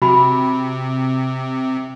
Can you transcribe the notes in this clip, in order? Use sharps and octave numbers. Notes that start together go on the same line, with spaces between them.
C3 F#4 B5